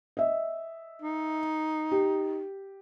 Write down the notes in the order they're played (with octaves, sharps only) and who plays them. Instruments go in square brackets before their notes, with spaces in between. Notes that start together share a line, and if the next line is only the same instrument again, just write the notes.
[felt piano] D#5 E5
[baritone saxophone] D#4
[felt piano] G4